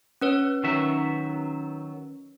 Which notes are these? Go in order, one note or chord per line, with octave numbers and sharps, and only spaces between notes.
C#4 B4 C#5
D#3 F#3 E5